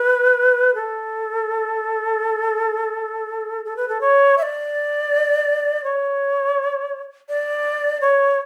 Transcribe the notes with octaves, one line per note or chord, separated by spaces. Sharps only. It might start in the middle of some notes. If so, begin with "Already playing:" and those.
Already playing: B4
A4
A4
B4
A4
C#5
E5
D5
C#5
D5
C#5